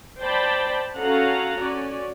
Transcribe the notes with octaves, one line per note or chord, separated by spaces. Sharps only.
C5 D5 G5 A5 B5
C#4 F#4 A4 F5 F#5 A#5
C#4 F#4 D5